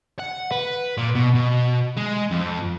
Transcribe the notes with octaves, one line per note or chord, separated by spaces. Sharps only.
F#5
B4
A#2
B2
B2
G#3
F2